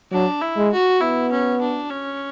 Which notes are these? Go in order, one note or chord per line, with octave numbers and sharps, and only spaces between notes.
F#3 D4
E4
G#3
F#4
B3 E4
C#4
D4
C#4